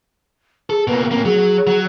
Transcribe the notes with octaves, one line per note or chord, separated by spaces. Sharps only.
G#4 A4
B2 A#3 B4
A2 A#3 C4
F#3 G#4
F#3